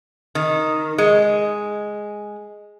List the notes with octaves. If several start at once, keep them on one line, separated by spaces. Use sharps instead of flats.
D#3
G#3